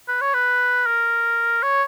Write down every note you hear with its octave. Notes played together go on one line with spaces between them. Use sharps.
B4
C#5
B4
A#4
C#5